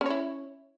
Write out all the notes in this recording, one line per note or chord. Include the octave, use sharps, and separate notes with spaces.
C#4 E4 C#5